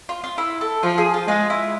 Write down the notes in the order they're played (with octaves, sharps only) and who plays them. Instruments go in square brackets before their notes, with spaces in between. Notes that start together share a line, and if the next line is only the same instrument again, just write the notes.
[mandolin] F4
F4
E4
A4
[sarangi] F3 [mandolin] F4
[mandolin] G#4
F4
[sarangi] G#3 [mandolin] F4
[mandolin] E4